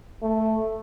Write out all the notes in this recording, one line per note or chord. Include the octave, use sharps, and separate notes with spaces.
A3